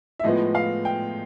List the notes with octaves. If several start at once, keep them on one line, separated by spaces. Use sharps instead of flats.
E5
A2 F3 G#3 B3 D#5
F5
G5